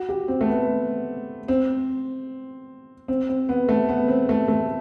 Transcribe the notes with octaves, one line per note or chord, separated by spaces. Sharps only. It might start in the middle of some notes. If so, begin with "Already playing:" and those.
Already playing: F#4
G4
C4
A3
B3
C4
C4
C4
B3
A3
B3
C4
A3
A3